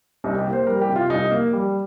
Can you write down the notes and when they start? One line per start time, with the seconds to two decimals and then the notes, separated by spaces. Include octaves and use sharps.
0.24 C2 D#4
0.38 G4
0.45 A#3
0.53 C5
0.67 G3 A#4
0.81 G4
0.89 C3
0.96 F4
1.10 C2 D#4
1.31 A#3
1.53 G3